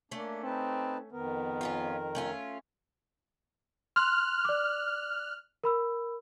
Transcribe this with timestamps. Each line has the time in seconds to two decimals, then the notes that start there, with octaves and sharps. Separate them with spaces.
0.11 A3 A#3 C#4 D4
0.44 C4 D#4 B4 A5
1.12 F2 D#3 B3 A#4
1.61 C#4 D#4 F4
2.15 A3 C#4 F4
3.96 C6 F6 F#6
4.45 D5 D6
5.64 A#4 B5 E6